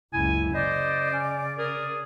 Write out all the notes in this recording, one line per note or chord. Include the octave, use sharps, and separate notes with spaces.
F#1 C#2 E4 G#5
C#3 C5 D5 D#5
C#4
G#4 A#4